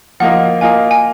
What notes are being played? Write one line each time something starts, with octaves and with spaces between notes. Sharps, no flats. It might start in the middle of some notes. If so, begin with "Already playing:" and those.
F3 A#3 F4 A#4 D#5 F#5
A#3 F4 A#4 D#5 G#5
G#5